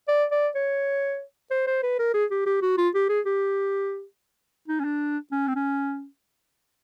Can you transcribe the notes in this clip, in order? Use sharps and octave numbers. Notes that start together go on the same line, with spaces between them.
D5
D5
C#5
C5
C5
B4
A#4
G#4
G4
G4
F#4
F4
G4
G#4
G4
D#4
C#4
D4
C#4
C4
C#4